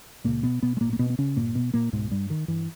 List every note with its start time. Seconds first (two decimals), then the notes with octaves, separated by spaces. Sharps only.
0.24 C#2 A#2 C#3 A#3
0.43 B2 B3
0.62 B2 B3
0.77 G#3
0.81 G2 A#2 A#3
0.84 G#1
0.93 A#3
0.99 B2 B3
1.10 B3
1.18 C#3 C#4
1.36 G1 G2 A#2 A#3
1.55 B2 B3
1.74 A#2 A#3
1.92 C#2 G#2 B2 G#3
2.11 G2 G3
2.30 D#3
2.48 G2 E3